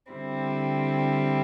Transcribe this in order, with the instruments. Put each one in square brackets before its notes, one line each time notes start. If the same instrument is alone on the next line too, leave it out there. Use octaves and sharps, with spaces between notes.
[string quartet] D3 G3 C4 E4